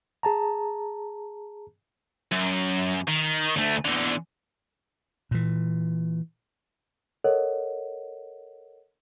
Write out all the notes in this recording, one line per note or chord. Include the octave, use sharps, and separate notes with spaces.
G#4 A5 A#5
F#2
D#3
D2 A3
E2 D3
A#2 E3
A4 A#4 C#5 D#5 F#5